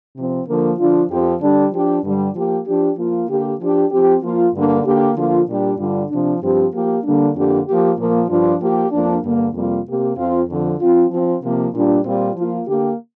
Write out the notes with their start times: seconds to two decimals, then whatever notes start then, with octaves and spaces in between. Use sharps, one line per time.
0.16 C3 F3 C4
0.47 D3 F3 A#3
0.78 D3 F3 D4 F4
1.09 F2 F3 C4 G4
1.40 D3 G3 D4
1.72 F3 D4 G4
2.04 G2 D3 G3
2.34 F3 A#3 G4
2.66 F3 D4 G4
2.97 F3 A#3 F4
3.29 D3 A#3 G4
3.59 F3 D4 G4
3.91 F3 C4 G4
4.22 F3 A#3 F4
4.54 G2 D3 A#3 D4
4.85 D3 A#3 G4
5.16 D3 F3 A#3 F4
5.47 A#2 G3 D4 G4
5.78 G2 D3 G3 D4 F4
6.10 C3 F3 D4
6.41 G2 F3 C4 G4
6.72 F3 A#3 G4
7.04 D3 G3 A#3 D4
7.35 F2 D3 A#3 D4 G4
7.66 F3 A#3 G4
7.97 A#2 F3 A#3
8.29 G2 F3 D4 F4
8.60 F3 A#3 G4
8.91 F2 F3 A#3 D4
9.23 G2 D3 A#3
9.54 F2 C3 G3 A#3 F4
9.86 C3 A#3 G4
10.17 F2 F3 C4 F4
10.48 F2 D3 F3
10.80 F3 C4 F4
11.11 F3 C4 F4
11.42 C3 F3 A#3
11.73 A#2 G3 D4 F4
12.04 A#2 G3 C4 F4
12.36 F3 A#3 F4
12.66 D3 A#3 G4